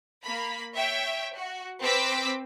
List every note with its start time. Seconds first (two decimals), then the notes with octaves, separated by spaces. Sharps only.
0.23 A#3 B5
0.75 C#5 E5 G5
1.34 F#4
1.81 C4 B4 D6 E6 B6